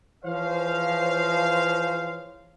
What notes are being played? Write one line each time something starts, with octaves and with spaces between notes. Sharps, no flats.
E3 F3 G#4 C5 C#5 F5